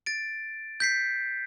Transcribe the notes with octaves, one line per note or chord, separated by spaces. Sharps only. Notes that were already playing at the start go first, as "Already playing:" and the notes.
A6 D7
G6 B6 C7